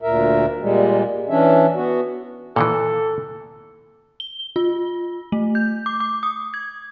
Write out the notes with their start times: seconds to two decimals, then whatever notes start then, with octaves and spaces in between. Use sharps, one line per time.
0.02 D2 A#2 A#4 E5
0.60 A#2 G3 G#3
1.29 E3 C#4 D4 E5
1.75 B3 F#4
2.56 A#2 D#3 E3 A4
4.20 G7
4.56 F4
5.32 A3
5.55 G6
5.86 D6
6.00 D6
6.23 D#6
6.54 G#6